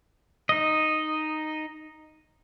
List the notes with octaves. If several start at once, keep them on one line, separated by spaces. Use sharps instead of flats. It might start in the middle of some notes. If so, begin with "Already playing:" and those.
D#4 D#5